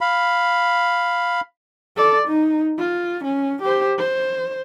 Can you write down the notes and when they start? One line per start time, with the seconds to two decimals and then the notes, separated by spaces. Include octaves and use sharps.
0.01 F5 B5
1.97 A4 D5
2.28 D#4
2.78 F4
3.24 C#4
3.62 G4 C5
3.98 C5